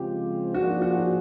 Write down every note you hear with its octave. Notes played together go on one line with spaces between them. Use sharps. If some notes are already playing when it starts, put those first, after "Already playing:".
Already playing: C#3 F3 G#3 C4 F4 G4
F3 A#3 D4 F4 F#4 G#4
F#4